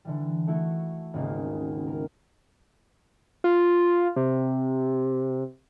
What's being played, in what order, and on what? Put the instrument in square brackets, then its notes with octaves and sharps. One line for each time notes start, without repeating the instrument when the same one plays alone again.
[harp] D3 E3 G3
A3 E4 F#4 A4
D#1 G#1 C#3 A#3
A#4
[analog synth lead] F4
C3